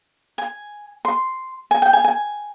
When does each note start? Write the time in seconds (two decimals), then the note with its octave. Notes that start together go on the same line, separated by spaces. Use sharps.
0.38 G#5
1.05 C6
1.71 G#5
1.82 G5
1.93 G#5
2.04 G#5